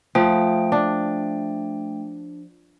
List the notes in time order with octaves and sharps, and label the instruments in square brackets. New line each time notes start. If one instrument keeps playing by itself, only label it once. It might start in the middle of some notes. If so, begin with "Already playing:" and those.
[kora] F3 [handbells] A3 G5
[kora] D4